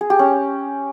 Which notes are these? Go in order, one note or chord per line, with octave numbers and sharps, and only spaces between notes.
G#4
G4
C#4